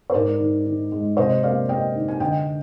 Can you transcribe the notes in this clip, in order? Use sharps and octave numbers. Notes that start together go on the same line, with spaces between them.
C5
G#2 A#4 D5
D#3
D#3
G#3
C3 C5 D#5
A#3 D5 F5
A#3 D#5 G5
D#3
G#5
D3 D#5 G5